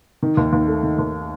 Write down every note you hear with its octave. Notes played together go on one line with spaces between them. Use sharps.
D#3
D#2
D#2
A3
D#3
D#2